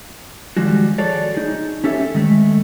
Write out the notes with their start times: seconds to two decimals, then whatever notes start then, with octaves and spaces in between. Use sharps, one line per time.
0.57 D#3 F3 G3 G#3 F#4
0.98 F#4 G#4 A4 C#5 D5
1.34 D#4 G#4
1.84 C#4 G4 A4 C#5 E5
2.14 D#3 G#3 A3